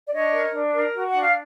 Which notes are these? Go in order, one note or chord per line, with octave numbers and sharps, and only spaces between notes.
D5
D4 C#5 D#5
A#4
D4
A#4
F#4
F#5
D4
F5